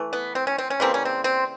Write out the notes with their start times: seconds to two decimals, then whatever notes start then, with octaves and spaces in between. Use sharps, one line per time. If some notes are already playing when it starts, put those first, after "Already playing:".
Already playing: E3 A3
0.13 B3
0.35 C4
0.47 C#4
0.58 C4
0.70 C#4
0.80 C#3 E3 G3 A#3 C4
0.94 C#4
1.05 C4
1.24 C4